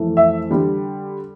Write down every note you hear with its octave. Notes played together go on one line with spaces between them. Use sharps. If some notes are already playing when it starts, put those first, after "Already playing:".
Already playing: F2 E3 A3
E5
D3 G3